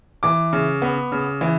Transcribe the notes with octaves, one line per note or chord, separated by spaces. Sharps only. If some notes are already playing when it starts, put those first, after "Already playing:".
E3 D6
C#3
B3
C#3
E3